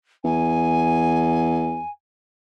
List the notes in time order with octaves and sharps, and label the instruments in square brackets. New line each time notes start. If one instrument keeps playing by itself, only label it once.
[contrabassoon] E2 [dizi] G#5